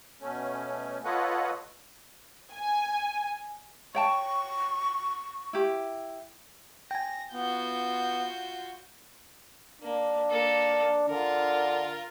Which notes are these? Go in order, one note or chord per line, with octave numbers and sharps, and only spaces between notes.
B2 A3 C#4
F4 A4 B4 C#5 D#5 F#5
G#5
C#5 G5 A5 C#6
E4 G4
G5 G#5 A#6
B3 F4 F#4 G6
A#3 D4
A#3 A4
D3 F4 A#4